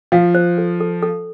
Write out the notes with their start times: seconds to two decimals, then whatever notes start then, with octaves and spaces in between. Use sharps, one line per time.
0.12 F3 F5
0.35 C5
0.58 A4
0.80 A4
1.02 A4